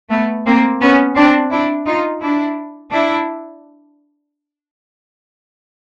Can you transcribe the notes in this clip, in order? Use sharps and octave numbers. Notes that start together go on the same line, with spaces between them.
A3 B3
A#3 C4
B3 C#4
C4 D4
D4 E4
D#4 F4
D4 E4
D4 E4